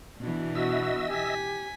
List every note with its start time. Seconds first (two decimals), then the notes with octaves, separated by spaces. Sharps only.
0.20 B2 E3 D4
0.55 F#4 D#5 E5 E6
1.09 G4 G#5 B6